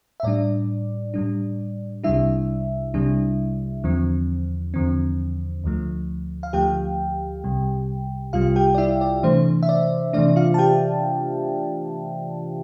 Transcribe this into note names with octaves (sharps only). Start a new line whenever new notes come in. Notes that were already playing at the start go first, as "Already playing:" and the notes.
E5
A2 G3 D4 D5
A2 G3 D4
C2 C3 G3 D4 E4 E5
C2 C3 G3 D4
E2 D3 F3 C4
E2 D3 F3 C4
D2 D3 F3 A3
F5
D2 D3 F3 A3 G4 G5
C2 C3 G3
C2 C3 G3 F4 F5
G4 G5
D5
E4 E5
D5
C3 E3 A3 D4 C5
E5
D5
C3 E3 A3 D4 D5
F4 F5
A5
G4 G5